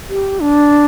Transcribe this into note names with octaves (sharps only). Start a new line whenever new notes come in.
G4
D4